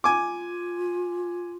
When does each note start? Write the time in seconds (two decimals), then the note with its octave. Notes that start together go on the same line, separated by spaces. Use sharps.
0.04 F4 G#5 D6